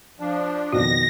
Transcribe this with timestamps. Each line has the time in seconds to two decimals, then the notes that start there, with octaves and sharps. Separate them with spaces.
0.20 F3 D4
0.72 F2 B2 D#3 F#4 A#6